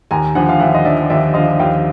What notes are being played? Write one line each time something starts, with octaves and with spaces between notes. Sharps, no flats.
D#2 G#5 A#5
D3 F3 F#5 G#5
F5
D#2 E5 F#5
D#5
D3 F3 D5 E5
D#2 D5 E5
D3 F3 D#5 F5
D#2 F5 G5